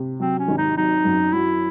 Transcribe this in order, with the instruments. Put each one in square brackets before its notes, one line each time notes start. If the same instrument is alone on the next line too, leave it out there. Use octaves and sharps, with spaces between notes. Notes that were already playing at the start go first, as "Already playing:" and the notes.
Already playing: [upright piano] C3
[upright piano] F#3 [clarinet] C4
[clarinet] C#4
[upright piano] G#1
[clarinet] D#4
[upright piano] F#3 [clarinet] D#4
[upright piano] F#2
[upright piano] F#3 [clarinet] E4